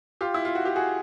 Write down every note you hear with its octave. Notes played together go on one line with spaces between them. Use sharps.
F4 G4
E4
F4
F#4
G4
F#4 G#4